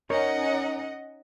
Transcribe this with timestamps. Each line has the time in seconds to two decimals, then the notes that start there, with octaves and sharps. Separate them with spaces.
0.10 C#4 D#4 A#4 C#5 D#5 F#5